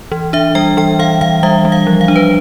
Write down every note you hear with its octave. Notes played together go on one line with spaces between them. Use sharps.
E3
D4 E5
G3 G5
E3 G5
E3 F5
E3 F5
G3 E5
G3
F5
F3
F5
D4
B4